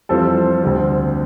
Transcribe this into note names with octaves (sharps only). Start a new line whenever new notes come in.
F2 E3 G3 C4 F4 A4 C5
D2 D3 G3 C4